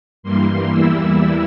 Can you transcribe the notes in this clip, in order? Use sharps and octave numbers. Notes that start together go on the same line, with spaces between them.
G2 E3 G3 A#3 C6
E2 E3 G3 A#3 E4 E6